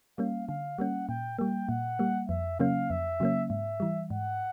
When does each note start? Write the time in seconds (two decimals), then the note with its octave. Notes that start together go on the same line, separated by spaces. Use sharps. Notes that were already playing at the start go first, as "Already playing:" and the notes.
0.18 G3 A#3 C#4 F5
0.48 D3 F5
0.78 G3 A#3 C#4 F#5
1.09 A#2 G5
1.39 G3 A#3 G5
1.69 A#2 F#5
1.99 G3 A#3
2.29 F2 E5
2.60 C#3 F#3 A#3 C#4 F5
2.90 F2 E5
3.20 C#3 F#3 A#3 C#4
3.50 G#2 E5
3.80 E3 G3
4.10 G#2 F#5